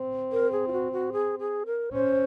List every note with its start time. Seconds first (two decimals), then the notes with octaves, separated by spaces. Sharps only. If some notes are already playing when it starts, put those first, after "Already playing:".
Already playing: C4
0.32 A#4
0.52 G#4
0.68 F4
0.72 F#4
0.92 F#4
1.13 G#4
1.39 G#4
1.66 A#4
1.93 C#4 C5